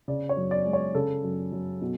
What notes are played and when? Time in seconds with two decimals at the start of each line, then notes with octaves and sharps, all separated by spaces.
0.08 C#3 D5
0.29 C#5
0.37 F#2
0.51 D5
0.66 G#3
0.73 C#5
0.95 C#3 A4
1.24 F#2
1.52 F#2
1.81 B2